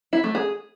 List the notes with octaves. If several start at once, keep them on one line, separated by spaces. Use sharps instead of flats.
E4
A3
G#4